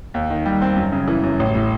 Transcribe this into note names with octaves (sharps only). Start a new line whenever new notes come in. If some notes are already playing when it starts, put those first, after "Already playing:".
D#2
D#3
G3
C4
F#2
C#3
E3
F#2
A1
A2